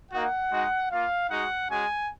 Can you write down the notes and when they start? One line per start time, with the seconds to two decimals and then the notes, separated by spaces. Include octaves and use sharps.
0.11 A#3 D#4 F#4 F#5
0.51 G#3 D#4 F#4
0.91 A#3 F4 F5
1.30 G#3 D#4 F#4 F#5
1.69 G#3 C#4 F#4 G#5